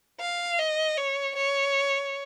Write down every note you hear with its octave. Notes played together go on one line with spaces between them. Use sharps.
F5
D#5
C#5
C#5